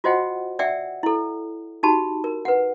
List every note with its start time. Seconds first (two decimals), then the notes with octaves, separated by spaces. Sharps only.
0.04 F4 F#4 C5 D#5 F#5 G5
0.59 D5 E5 F#5 G5 E6
1.03 E4 A4
1.83 D#4 F#4 G4 A5 B5
2.24 A#4
2.45 B4 F#5